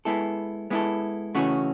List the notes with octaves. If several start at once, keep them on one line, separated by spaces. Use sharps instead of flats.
G#3 B3 E4 A4
G#3 B3 E4 A4
C#3 E3 A3 C#4 F#4